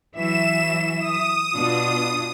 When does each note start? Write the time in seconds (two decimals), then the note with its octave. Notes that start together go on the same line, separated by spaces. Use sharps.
0.16 E3 F#3 E5 E7
0.99 D#6
1.53 B2 D4 F4